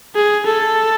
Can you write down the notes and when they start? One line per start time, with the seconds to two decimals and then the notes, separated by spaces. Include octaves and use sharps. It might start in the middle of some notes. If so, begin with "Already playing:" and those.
0.15 G#4
0.46 A4